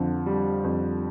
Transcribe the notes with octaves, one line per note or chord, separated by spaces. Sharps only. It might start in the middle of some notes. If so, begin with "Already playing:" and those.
Already playing: F2 D3
G3
F2